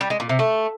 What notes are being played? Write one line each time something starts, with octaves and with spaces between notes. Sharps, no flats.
G3
G#3
A#2
C3
A3